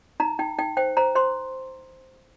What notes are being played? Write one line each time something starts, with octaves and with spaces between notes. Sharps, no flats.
D#4 A#5
D#4 G5
D#4 G5
C5 G5
C5 A#5
C5 C6